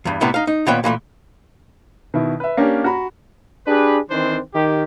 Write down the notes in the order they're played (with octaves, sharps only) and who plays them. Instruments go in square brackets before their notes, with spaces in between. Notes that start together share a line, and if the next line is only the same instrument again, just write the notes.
[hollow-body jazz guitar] E2 G2
A2 C3 G3 B3 E4
D#4 F5
D#4
A#2 D#3 B3 B4 C#5 G5
A#2 E3 G#3 A3
[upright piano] B2 D#3 E4
B4 E5
A#3 C#4 D4 G4 A#4
F#4 A#5 B5
[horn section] D4 G4 G#4 B4
D#3 E3 C4 D4 C5
D#3 G4